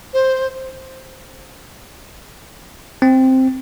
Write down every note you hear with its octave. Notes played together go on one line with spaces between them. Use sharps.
C5
C4